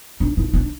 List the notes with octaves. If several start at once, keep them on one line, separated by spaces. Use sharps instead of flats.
D4
E4
D4